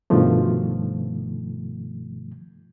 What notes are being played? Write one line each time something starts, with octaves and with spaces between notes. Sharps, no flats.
G2 B2 D#3 F3 A3